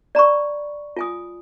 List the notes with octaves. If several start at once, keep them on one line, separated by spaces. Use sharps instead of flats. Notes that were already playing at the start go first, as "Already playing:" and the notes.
D5 A#5 B5 C#6
F4 G#5 D#6